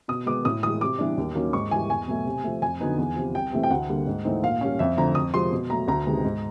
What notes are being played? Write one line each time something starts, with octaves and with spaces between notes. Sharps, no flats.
B2 D#6
G#3 B3 D6
A2 D#6
E3 G#3 D#6
C3 D6
E3 G3 B3 D4
D#2
D#3 F#3 A#3 C#4
G#2 C#6
E3 G3 G#5
E2 G#5
B2 F#3 A3
C3
F3 A3
F2 G#5
D3 F#3 B3 D#4
E2
C3 F3
C2 G5
C3 E3 A3 C4
G5
D2 F#5
D3 G3 A#3
G#2
E3 A3 C4 D#4
A#2 F5
G3 A#3 C#4
F2 E5
D3 F3 A3 C4 A#5
F2 D#6
C3 F3 G#3 C6
B2
F#3 A3 A#5
D2 A#5
C3 D#3 G#3 B3
G#2